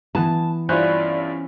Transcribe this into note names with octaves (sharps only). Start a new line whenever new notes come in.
E3 B3 E4 A5
G2 C#4 E4 F4 C5 D5 F#6